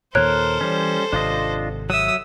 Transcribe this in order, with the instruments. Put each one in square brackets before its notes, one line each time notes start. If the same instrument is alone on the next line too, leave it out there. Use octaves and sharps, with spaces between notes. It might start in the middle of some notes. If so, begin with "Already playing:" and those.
[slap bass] D#2 A#2 [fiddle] A4 C5 [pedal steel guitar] A#4 [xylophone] C#5 F#6
[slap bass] E3 [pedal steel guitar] G3 C#4
[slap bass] G#1 C3 [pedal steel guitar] D4 F4 D#5
[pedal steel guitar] F#3 E5 [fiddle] D#6 E6